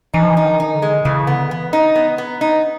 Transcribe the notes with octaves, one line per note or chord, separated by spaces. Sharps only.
E3 D#4
F3
E3
D#4
D#3
D#4
D3
G#3
C#3 E3
D3 B3
E3 B3
D#4
B3
B3
D#4